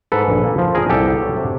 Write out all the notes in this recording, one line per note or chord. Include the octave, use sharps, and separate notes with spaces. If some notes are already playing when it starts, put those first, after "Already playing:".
G#2 A4 B4
A#1
A#3
F3
A#2 G#4 A#4
C2 G4 A4
B3
F#3
C3